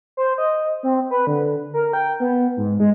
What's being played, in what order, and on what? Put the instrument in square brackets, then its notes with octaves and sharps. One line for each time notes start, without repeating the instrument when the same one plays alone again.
[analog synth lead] C5
D#5
C4
B4
D3
A#4
G5
B3
G#2
G#3